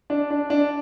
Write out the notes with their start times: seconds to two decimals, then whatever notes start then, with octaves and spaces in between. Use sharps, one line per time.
0.10 D4
0.30 D4
0.50 D4